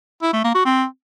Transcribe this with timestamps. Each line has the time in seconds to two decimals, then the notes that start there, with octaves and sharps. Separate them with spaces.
0.22 E4
0.33 A3
0.44 A#3
0.55 F#4
0.65 C4